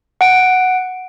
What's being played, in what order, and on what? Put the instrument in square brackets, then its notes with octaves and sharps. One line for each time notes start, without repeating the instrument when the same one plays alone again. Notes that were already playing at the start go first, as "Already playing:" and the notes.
[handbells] F#5 D7